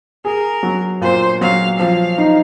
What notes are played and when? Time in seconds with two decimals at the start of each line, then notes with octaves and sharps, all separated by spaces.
0.25 G#4 A#4
0.63 F#3
1.01 A#2 C5
1.41 F#3 F5
1.79 F3 F5
2.18 D#4